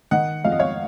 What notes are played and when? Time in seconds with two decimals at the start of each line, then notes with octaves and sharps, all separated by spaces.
0.11 D#3 D#5 F#5
0.44 F2 F5
0.52 D#5
0.59 C#5 F5